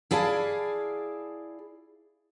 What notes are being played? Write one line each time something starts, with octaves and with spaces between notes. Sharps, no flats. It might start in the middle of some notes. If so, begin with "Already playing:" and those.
E4 G#4 D5 F5 A5